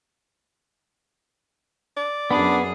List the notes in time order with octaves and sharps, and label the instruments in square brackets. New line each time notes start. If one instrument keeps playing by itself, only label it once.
[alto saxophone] D5
[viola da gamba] F#2 G#4 [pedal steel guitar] B3 B5 [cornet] D4